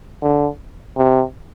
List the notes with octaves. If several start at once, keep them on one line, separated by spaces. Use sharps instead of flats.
D3
C3